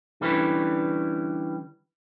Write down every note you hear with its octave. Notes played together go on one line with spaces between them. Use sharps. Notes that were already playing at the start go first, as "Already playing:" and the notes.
D3 E3 G3 C#4 B4